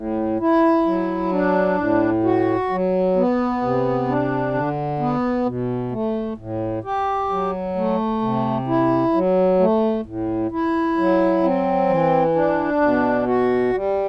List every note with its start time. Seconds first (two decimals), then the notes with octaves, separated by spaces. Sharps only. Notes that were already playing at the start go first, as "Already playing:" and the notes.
Already playing: A2
0.40 E4
0.86 F#3
1.32 D4
1.78 A2
2.24 F#4
2.70 F#3
3.16 B3
3.62 C3
4.08 D4
4.54 D3
4.99 B3
5.46 B2
5.92 A3
6.37 A2
6.84 G4
7.29 F#3
7.76 A3
8.22 C3
8.68 E4
9.14 F#3
9.60 A3
10.06 A2
10.52 E4
10.97 F#3
11.43 C4
11.89 E3
12.35 D4
12.82 B2
13.27 F#4
13.73 G3